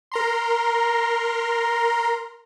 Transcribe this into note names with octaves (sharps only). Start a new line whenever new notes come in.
A#4 A#5 C6